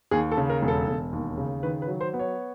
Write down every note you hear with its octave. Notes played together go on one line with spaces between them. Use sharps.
D#2 G#4
A4
C#3
A#4
E1
A4
E1
D#2
C#3
D#3 B4
B4
F#3
C5
B3
C#5